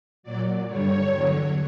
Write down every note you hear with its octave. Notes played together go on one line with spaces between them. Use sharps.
A#2 F#3 D5
G2 D3 G3 C#5
E2 D3 F#3